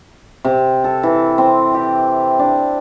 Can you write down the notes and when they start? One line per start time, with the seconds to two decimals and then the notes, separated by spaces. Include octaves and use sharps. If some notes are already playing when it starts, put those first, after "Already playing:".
0.44 C3
0.84 A4
1.03 E3
1.38 C4
1.74 G4
2.39 D4